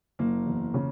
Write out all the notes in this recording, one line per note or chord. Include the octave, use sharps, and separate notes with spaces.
F#1 A#3
E2
C#3